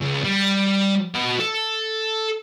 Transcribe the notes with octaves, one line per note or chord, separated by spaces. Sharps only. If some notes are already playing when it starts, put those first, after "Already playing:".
C#2
G3
F#4 D#5
A4